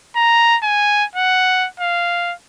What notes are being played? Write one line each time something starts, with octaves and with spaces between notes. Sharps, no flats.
A#5
G#5
F#5
F5